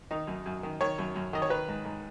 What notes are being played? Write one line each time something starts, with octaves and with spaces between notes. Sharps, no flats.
D#3 D#4
F#2
F#2
D#3
D#3 C#5
F#2
F#2
D#3 D#5
C#5
D#3 B4
G#2
G#2